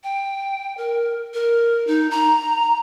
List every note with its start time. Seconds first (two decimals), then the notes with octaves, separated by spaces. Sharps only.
0.03 G5
0.77 A#4
1.34 A#4
1.87 D#4
2.11 A#5